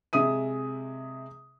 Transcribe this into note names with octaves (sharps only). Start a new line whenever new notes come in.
C3 G#3 E5 D#6 D#7